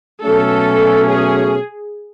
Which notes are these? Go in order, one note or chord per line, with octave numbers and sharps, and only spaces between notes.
B2 F#3 A3 C#4 A4
G#4